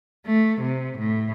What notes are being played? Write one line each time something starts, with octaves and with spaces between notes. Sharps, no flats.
A3
C3
A2